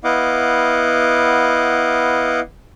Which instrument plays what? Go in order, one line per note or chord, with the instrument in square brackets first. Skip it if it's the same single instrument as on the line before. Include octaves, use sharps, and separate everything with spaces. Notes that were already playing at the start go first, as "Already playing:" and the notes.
[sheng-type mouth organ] B3 E4 D#5 F5 F#5 D6